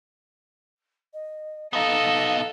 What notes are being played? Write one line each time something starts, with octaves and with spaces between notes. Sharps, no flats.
D#5
B3 D#4 A4 F5